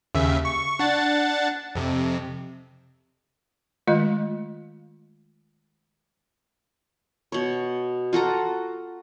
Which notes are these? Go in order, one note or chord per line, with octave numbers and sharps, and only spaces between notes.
D#2 C#3 E5
C#6
D4 F#5 A6
F2 C3
D#3 G#3 A3 F4 D#5
B2 C#5
F4 F#4 A4 A#5